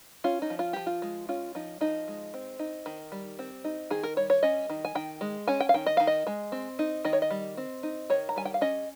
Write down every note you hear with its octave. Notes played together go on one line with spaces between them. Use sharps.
C#4 F4
D#4
F3
F4
F3 G4
F4
G#3
C#4 F4
F3 D#4
F3 D#4
G#3
C4
D#4
D#3
G3
C4
D#4
D#3 G#4
A#4
G3 C#5
C#5
C#4 D#5
D#3
G#5
D#3 G5
G#3
C#4 G#5
G5
F5
D#3 G5
D#5
D#3 F5
D#5
G#3
C4
D#4
D#3 D#5
C#5
D#5
G3
C4
D#4
D#3 C#5
A#5
G3 G#5
G5
F5
C#4 D#5